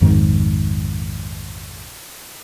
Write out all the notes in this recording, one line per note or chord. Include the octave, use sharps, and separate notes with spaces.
A#1 F2 G#2 D#3